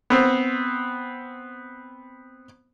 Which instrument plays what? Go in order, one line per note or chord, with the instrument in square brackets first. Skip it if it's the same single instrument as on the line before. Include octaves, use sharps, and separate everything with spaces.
[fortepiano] B3 C4